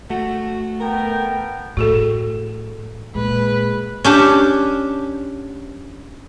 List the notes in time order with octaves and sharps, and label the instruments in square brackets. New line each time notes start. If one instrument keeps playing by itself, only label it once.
[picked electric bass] A3 [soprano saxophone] F#4
[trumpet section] B3 A4 G5 [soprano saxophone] A#4
[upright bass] A2 [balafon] F#4 G#4 A4
[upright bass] A#2 [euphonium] G#3 [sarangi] B4
[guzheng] C#4 D4 G4